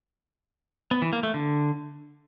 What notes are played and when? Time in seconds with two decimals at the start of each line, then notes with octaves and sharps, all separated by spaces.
0.91 B3
1.02 E3
1.13 A#3
1.23 A3
1.34 D3